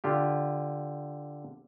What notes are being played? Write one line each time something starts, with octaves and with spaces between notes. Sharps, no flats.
D3 F4 G4